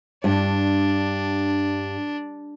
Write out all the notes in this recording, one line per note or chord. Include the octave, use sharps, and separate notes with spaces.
G2 D4